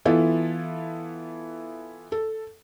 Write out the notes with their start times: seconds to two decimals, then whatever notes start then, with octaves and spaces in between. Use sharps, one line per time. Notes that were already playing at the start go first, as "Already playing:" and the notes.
0.05 E3 B3 E4 F4 A4
2.12 A4